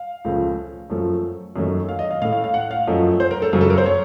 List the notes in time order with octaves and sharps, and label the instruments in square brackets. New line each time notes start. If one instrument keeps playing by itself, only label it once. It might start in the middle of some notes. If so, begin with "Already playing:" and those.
Already playing: [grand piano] F5
C#2 C#3 F3 A3
F#2 F3 A3
F#2 D#3 F#3 A3
F5
D#5
F5
A2 F5
A3
F5
F5
F#5
F5
F#2 F3 A3 D#5
C5
A#4
A4
F#2 C#3 F#3
A4
A#4
C5
C#5